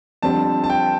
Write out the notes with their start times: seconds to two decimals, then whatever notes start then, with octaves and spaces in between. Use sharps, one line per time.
0.22 F2 D3 G3 C4 A5
0.64 A5
0.70 G5